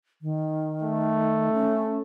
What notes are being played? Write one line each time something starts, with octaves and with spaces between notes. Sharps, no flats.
D#3
A3
C#4